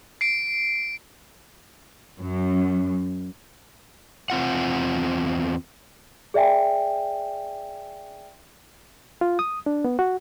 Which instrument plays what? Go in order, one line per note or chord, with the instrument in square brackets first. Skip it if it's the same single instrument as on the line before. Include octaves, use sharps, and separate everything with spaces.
[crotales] C7 D7
[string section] F#2
[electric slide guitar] E2 C4 F4 F#5
[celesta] G#4 D5 E5 G5 G#5
[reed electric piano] F4
D#6
D4
B3
F#4